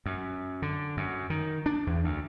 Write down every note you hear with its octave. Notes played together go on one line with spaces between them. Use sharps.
F#2
D3
F#2
D#3
D4
E2
D2